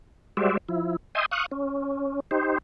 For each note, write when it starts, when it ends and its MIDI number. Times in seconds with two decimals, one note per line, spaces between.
0.37 0.57 55
0.37 0.57 56
0.37 0.57 66
0.37 0.57 72
0.37 0.57 74
0.37 0.57 76
0.69 0.96 53
0.69 0.96 64
1.15 1.26 75
1.15 1.26 76
1.15 1.26 79
1.15 1.26 80
1.15 1.26 84
1.15 1.26 87
1.31 1.46 77
1.31 1.46 85
1.31 1.46 87
1.31 1.46 90
1.52 2.20 61
2.31 2.58 63
2.31 2.58 67
2.31 2.58 72